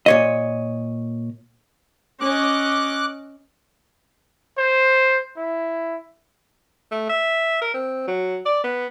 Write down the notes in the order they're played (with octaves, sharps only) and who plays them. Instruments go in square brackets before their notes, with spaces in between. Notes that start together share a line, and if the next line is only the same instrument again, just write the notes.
[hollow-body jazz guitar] A#2 C#5 D#5
[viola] C#4 D#5 [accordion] D6 F#6
[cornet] C5
E4
[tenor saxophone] A3
E5
A#4
C4
F#3
D5
B3